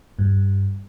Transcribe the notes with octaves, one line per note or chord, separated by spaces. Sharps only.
G2